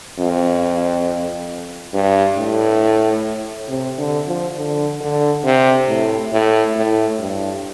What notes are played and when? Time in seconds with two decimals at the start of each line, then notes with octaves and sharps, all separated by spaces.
0.19 F2
1.94 G2
2.37 A2
3.68 C3
3.98 D3
4.27 F3
4.56 D3
5.00 D3
5.44 C3
5.88 A2
6.32 A2
6.76 A2
7.19 G2